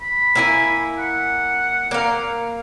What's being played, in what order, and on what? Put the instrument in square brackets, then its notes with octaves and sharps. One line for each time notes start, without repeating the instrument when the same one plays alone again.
[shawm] B5
[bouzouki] A#3 E4 G#5
[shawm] F#5
[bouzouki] A#3 F5